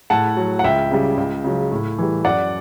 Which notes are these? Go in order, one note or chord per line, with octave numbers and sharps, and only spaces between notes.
A2 F#5 A5
F#3
F#5
C#2 E5 G5
C#3 G3
C#2
C#3 F#3
A2
E3 G3
F#2 D5 F#5